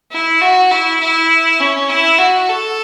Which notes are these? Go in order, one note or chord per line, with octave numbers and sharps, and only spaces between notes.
E4
F#4
E4
E4
C#4
E4
F#4
A4